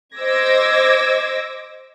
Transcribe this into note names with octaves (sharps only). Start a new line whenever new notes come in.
C5 D#5 D6 E6 G#6 A#6